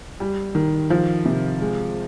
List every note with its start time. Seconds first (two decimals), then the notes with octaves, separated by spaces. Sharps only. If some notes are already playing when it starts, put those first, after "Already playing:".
0.20 G3
0.55 D#3
0.90 F3
1.25 C3
1.61 G#3